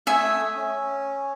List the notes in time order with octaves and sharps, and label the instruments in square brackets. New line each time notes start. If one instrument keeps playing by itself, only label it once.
[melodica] A3 D#6 E6 [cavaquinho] E5 G#5
[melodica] C#4